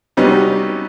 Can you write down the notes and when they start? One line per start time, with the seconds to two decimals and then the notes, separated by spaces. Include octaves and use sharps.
0.17 C3 F#3 G3 B3 C#4 D#4